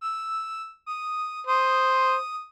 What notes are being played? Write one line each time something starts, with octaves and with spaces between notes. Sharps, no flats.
E6
D#6
C5 D#6